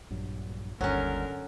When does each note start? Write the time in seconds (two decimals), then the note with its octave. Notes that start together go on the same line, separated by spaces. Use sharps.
0.10 A#1 G2 F#3
0.81 G1 D#2 D3 F#3 G3 C#4 A#4